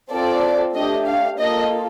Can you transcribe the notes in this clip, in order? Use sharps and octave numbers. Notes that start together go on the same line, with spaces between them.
C4 F4 A4 D5
A3 D4 G4 D#5
F5
A#3 F4 A4 D#5